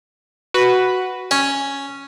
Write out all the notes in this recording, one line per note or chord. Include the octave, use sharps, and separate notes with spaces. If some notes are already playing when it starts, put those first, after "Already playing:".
F#4 B4
C#4